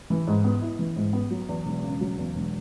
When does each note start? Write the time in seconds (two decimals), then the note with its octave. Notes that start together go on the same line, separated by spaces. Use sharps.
0.10 E3
0.27 G#2
0.44 B3
0.62 E4
0.79 E3
0.96 G#2
1.13 B3
1.31 F#3
1.49 E2
1.65 E1
1.83 C#3
2.01 F#3
2.18 E2
2.35 E1